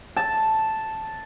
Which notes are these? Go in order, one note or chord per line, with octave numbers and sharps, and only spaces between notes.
A5